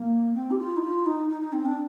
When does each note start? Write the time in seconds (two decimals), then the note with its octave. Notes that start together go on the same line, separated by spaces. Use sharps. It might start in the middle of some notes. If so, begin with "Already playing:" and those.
Already playing: A#3
0.34 C4
0.51 G4
0.58 F4
0.77 D#4
0.82 F4
1.06 D#4
1.29 D#4
1.41 D#4
1.53 C4
1.65 D4